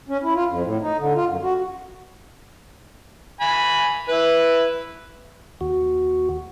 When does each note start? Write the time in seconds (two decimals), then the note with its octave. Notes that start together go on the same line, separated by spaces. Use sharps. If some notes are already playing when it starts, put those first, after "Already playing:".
0.08 C#4
0.23 E4
0.35 F4
0.47 F2
0.64 A2
0.81 D#4
0.98 D3
1.15 F4
1.27 F#2
1.42 F#4
3.41 G#5 B5
4.09 E4 B4
5.61 D#2 F#4